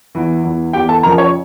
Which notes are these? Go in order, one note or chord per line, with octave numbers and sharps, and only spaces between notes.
E2 E3
E2 E3
E2 E3 G4 G5
A4 A5
F2 C#3 F3 A#4 A#5
C#5 C#6